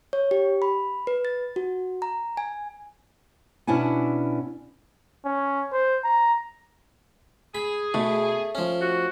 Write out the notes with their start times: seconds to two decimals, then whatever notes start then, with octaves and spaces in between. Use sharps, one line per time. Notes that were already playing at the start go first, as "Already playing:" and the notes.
0.13 C#5
0.31 G4
0.62 B5
1.07 B4
1.25 A6
1.56 F#4
2.02 A#5
2.37 G#5
3.67 B2 C#4 D4 E4 F#5 G#5
5.25 C#4
5.73 C5
6.04 A#5
7.55 G#4 B5
7.94 B2 A3
8.55 F3 C#4
8.81 F#4